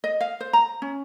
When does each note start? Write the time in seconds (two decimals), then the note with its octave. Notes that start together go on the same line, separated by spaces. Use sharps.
0.04 D#5
0.21 F5
0.41 C5
0.53 A#5
0.82 C#4